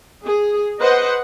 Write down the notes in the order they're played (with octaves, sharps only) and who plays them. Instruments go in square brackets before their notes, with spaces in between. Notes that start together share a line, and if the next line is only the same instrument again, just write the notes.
[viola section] G#4
B4 C5 D#5 F#5